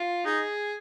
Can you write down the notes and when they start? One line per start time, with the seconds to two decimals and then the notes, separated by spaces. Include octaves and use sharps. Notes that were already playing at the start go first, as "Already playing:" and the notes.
Already playing: F4
0.25 D#4 G#4